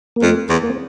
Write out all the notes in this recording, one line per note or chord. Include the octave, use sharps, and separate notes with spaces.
A#3
F2 A3
E2
A#3
C4